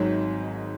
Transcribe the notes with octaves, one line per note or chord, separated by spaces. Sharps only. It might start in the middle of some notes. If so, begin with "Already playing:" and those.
Already playing: G#1 G#2 F#3